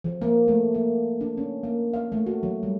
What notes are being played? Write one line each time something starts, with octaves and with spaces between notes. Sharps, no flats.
F3
A#3
A3
A#3
D4
C#4
A#3
F5
A3
F#4
F#3
G3